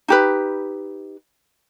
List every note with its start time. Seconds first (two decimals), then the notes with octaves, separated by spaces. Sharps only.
0.08 D#4 G4 B4